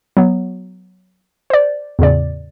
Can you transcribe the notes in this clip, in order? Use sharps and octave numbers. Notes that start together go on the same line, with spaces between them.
F#3 B3
C5 D5
E2 A2 C#3 D5